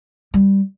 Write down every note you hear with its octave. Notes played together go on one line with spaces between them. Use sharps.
G3